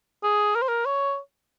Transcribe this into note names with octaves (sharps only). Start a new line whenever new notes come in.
G#4
A#4
C5
A#4
C#5